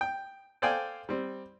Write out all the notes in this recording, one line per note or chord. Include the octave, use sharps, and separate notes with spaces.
G5
A4 C5 D5 F5 G5 G#5
G3 C4